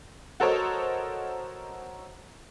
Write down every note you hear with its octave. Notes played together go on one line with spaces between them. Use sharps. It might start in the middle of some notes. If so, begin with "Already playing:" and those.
F#4 A4 A#4 C5 C#5 D#5